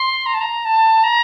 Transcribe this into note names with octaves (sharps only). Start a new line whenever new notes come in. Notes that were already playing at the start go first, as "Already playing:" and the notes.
Already playing: C6
A#5
A5
A#5
A5
A#5